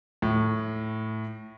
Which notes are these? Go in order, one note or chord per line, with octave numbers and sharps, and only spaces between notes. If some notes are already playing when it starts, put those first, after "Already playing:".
A2